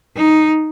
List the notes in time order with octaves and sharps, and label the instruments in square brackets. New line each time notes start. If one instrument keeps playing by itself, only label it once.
[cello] D#4